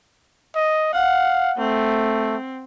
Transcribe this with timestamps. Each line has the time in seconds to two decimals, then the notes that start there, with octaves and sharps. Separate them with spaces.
0.55 D#5
0.93 F5 F#5
1.58 A3 C4